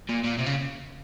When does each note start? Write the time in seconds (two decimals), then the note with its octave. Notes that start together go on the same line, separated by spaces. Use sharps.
0.09 A#2
0.24 A#2
0.38 C3
0.46 C#3